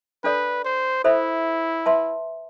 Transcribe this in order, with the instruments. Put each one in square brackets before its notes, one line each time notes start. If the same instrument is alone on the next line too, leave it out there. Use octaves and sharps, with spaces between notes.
[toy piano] D4 A4 D5 [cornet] B4
[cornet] C5
[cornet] E4 [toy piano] A4 C5 E5 B5
[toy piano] B4 E5 A5 C6